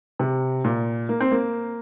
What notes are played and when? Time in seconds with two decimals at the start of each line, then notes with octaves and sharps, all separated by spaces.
0.19 C3
0.64 A#2
1.09 A#3
1.21 C4
1.32 A#3